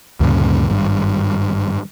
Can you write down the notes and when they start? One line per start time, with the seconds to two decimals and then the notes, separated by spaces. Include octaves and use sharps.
0.20 D2 G2 A#2 C#3
0.70 G#1 G2